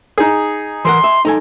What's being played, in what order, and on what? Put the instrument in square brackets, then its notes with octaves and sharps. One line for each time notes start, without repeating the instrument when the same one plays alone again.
[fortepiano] D#4 G#4
[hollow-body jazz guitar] E3 A#4 F#5 [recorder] C6
[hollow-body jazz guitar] E5
D#4 A4 G#5